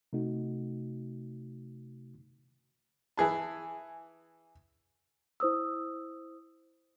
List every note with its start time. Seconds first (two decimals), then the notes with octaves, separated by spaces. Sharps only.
0.13 C3 A3 D#4 F#4
3.17 E3 G#4 A5
5.40 E4 C5 D#6 E6